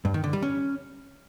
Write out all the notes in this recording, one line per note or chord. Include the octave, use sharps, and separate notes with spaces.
G2
D#3
D3
G3
C#4